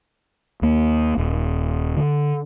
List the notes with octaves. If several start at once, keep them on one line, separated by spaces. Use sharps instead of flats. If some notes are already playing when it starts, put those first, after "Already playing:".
D#2 A#3
D#1
D3